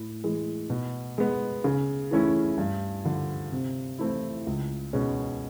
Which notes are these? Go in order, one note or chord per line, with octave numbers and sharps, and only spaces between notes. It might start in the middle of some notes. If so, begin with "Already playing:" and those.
Already playing: A2
E3 G#3
B2
G#3 B3
C#3
E3 A3 C#4 E4
G2
D3 F3
C3
E3 A3 C4 E4
C#2
B2 G#3 C#4